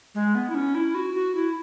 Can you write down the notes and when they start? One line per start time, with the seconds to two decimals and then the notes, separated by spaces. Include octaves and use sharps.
0.15 G#3
0.35 B3
0.50 E4
0.55 C#4
0.75 E4
0.95 F#4
1.15 F#4
1.35 E4